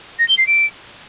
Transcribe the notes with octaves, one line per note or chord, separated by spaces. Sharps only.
A#6
G7
C7
D7